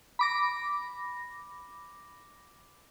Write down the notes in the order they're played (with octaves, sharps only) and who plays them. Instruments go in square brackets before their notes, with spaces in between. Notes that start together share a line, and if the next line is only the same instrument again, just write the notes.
[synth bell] B5 D6 A#6